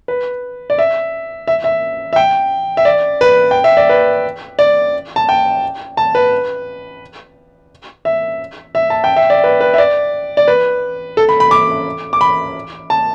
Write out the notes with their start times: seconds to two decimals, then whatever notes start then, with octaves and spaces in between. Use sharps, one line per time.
0.08 B4
0.70 D5
0.79 E5
1.47 E5
1.64 E5
2.13 E5
2.16 G5
2.77 E5
2.85 D5
3.21 B4
3.51 G5
3.64 E5
3.77 D5
3.89 B4
4.59 D5
5.16 A5
5.29 G5
5.97 A5
6.15 B4
8.05 E5
8.75 E5
8.90 A5
9.04 G5
9.16 E5
9.30 D5
9.44 B4
9.61 B4
9.74 E5
9.78 D5
10.37 D5
10.48 B4
11.17 A4
11.29 B5
11.40 B5
11.51 D6
12.13 D6
12.21 B5
12.90 A5